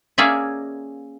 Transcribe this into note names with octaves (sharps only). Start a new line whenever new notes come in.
A#3 C#4 G#4 D5 E5